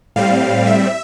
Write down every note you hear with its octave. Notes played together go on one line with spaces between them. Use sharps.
A2 G3 C4 F5
E5